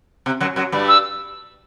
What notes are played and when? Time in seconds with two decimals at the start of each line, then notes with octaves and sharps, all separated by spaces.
0.26 C3
0.40 F#2 F#3
0.56 F#2 F#3
0.72 G2 G3
0.88 E6